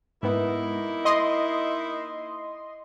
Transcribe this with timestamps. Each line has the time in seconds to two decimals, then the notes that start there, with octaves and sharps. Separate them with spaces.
0.23 G#2 A#3 B3 D#4 E4
1.05 D#5 C6